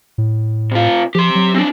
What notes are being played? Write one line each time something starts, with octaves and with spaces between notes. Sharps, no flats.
A2
C3 F4
F3 G4 C6
F#3
C4 D4